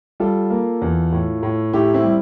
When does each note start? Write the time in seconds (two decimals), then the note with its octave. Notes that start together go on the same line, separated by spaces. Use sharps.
0.20 G3 F4 A4
0.50 A#3
0.81 E2
1.12 A2
1.43 A2
1.73 A2 E4 G4
1.94 C4 E4
2.04 G3